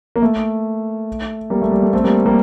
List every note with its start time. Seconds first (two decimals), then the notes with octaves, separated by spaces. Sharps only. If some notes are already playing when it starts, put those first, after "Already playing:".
0.16 A#3
0.22 A3
1.50 G3 A#3
1.62 A3
1.72 G3
1.83 A3
1.93 A3 C4
2.04 G3 A#3
2.26 G3 A#3